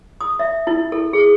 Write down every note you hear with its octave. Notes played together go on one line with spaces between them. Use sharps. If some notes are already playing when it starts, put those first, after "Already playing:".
D#6
E5
E4
A4
G#4